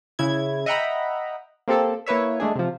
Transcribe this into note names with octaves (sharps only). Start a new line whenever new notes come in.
C#3 E4 G#6
D#5 E5 F#5 G5 A#5 B5
A#3 C4 G4 A4
A#3 E4 B4 C#5 E5
G#3 A3 D4 G#4
C3 F3